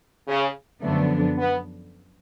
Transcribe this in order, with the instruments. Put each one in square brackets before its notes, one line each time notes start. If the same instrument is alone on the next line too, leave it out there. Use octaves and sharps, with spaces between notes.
[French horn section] C#3
[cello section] F#2 D3 F3 B3 D4 [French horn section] A3
[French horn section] B3